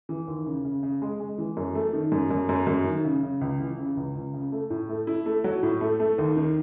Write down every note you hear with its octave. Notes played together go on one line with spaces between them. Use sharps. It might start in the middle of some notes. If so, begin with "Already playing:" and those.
E3
D#2
C#3
C#3
C#3
G#3
G#3
E3
F#2
A3
D#3
F#2
F#2
F#2
F#2
D#3
C#3
C#3
C#2
E3
C#3
C#2
C#2
C#3
A3
A2
A3
E4
A3
F#3
A2
A3
A3
D#2
D#3